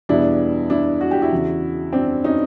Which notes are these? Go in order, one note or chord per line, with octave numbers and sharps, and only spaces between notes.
E2 B2 G3 B3 D4 E4
D4 E4
F#4
G4
E4 F#4
E2 C#3 E3
C4 D4
C#4 D#4